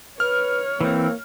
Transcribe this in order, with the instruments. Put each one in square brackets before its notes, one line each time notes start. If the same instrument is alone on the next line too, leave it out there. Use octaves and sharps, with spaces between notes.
[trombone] B4 [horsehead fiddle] C#5 [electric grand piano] F6
[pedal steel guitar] E3 C4 [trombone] A#3